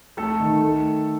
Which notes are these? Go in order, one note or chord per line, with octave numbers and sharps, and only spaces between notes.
A3 A4
D#3
A3